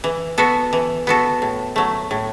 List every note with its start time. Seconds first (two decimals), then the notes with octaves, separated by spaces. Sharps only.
0.04 E3
0.38 B3 F#4 A4
0.73 E3
1.07 B3 F#4 A4
1.42 A2
1.76 F#3 A3
2.11 A2